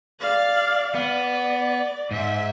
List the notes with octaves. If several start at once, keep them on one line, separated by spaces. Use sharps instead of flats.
D5 F5
B3 D5
G#2 E5